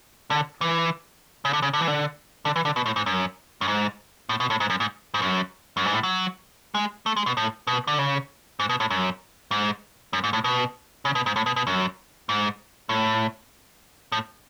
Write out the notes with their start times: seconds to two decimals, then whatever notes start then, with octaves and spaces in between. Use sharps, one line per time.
0.30 D3
0.61 E3
1.45 C#3
1.53 D3
1.63 C#3
1.73 D3
1.81 E3
1.87 D3
2.45 D3
2.56 E3
2.65 D3
2.76 B2
2.86 A2
2.96 G#2
3.06 F#2
3.61 F#2
3.68 G#2
4.29 A2
4.40 B2
4.50 A2
4.60 G#2
4.70 F#2
4.80 G#2
5.14 G#2
5.22 F#2
5.77 F#2
5.85 G#2
5.93 A2
6.03 F#3
6.75 G#3
7.06 A3
7.17 G#3
7.26 B2
7.37 A2
7.67 B2
7.87 D3
7.99 C#3
8.60 G#2
8.69 B2
8.80 A2
8.90 F#2
9.51 G#2
10.13 F#2
10.24 G#2
10.33 A2
10.44 B2
11.05 C#3
11.15 B2
11.26 G#2
11.36 A2
11.46 B2
11.56 B2
11.67 F#2
12.29 G#2
12.89 A2
14.12 A2